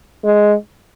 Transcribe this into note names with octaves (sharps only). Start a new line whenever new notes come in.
G#3